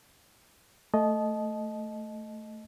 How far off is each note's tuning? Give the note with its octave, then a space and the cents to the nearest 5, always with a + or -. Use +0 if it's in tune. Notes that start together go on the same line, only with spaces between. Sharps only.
A3 +5 D#5 +0 A5 -30